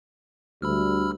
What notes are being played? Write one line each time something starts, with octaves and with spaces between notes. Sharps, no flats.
D2 G3 B5 E6 F6